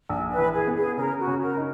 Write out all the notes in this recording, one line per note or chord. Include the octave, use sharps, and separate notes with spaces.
A#1
B4
E3
G#4
B3
G#4
C#3 A#4
F#4
C#3
A#4
D#4